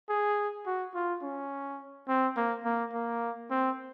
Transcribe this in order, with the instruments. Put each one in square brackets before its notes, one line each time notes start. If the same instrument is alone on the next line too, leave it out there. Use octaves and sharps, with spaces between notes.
[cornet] G#4
F#4
F4
C#4
C4
A#3
A#3
A#3
C4